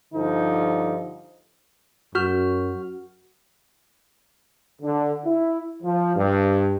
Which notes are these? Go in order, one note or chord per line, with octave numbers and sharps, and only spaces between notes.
G2 D3 F3 D#4
F#2 F#4 F6
D3
E4
F3
G2